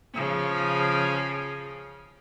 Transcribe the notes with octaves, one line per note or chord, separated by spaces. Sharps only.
C#3 F3